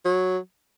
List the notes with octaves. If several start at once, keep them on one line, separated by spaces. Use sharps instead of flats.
F#3